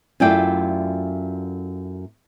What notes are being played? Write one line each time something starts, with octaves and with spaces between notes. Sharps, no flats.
F#2 A3 E4 F4 D5 G5